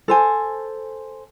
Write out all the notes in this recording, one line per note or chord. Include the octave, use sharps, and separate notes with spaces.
A4 C5 G#5